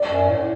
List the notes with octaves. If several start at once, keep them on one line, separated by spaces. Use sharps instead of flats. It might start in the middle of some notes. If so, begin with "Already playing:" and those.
Already playing: D5
F#2
A2